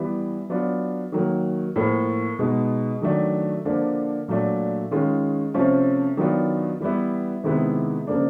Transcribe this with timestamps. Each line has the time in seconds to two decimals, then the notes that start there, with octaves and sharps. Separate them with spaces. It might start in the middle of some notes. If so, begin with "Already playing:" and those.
Already playing: E3 G3 B3
0.49 F#3 B3 D4 F4
1.12 D#3 F#3 A#3
1.76 A2 F3 A#3
2.39 B2 G#3 B3 D#4
3.02 D#3 F#3 A3 D4
3.65 D3 F3 A#3 D4 F4
4.28 A#2 F#3 A3 D4
4.91 D#3 G#3 C#4 F4
5.54 C3 F3 A3 C#4 F4
6.17 D#3 F#3 B3 D4 F4
6.81 E3 G3 B3 E4
7.43 C3 D#3 G#3 B3 E4
8.07 C#3 F3 A#3 D4